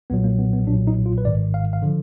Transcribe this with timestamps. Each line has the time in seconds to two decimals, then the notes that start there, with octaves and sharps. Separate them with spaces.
0.10 B1 A#2 F#3 B3
0.24 A#3
0.39 B3
0.53 B3
0.67 B1 A#2 F#3 D4
0.87 D#4
1.06 F4
1.18 B4
1.25 G#1 G#2 D#3 D5
1.54 F5
1.73 F5
1.82 D3 F3